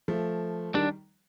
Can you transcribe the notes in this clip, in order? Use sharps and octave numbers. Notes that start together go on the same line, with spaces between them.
F3 A3
D#3 G3 D4